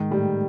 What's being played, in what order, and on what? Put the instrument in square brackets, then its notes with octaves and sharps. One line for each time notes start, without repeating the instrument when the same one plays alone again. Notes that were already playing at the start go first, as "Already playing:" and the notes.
Already playing: [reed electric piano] G#2 G#3 [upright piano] D#3
[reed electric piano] A2 A3 [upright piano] G3